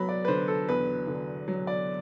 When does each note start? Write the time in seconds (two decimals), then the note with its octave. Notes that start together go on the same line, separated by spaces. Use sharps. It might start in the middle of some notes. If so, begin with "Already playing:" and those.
Already playing: F#3 B3 B5
0.09 D5
0.25 B4
0.28 D3 C5
0.48 A4
0.69 E2 B4
1.07 D3
1.48 F#3
1.67 D5